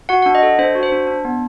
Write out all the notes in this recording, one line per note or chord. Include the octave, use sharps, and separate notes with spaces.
F#4 F#5
F#5
D4
D#5
A4
D4 C5
F#4
C5
D4
D4
B3